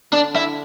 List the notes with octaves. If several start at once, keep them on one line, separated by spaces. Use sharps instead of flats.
D3 D4
E4